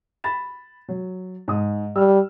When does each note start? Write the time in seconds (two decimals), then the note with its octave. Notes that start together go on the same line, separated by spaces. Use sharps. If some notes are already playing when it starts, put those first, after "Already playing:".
0.24 B5 A6 E7
0.89 F#3
1.48 G#2 D#6
1.96 G3 E6 F6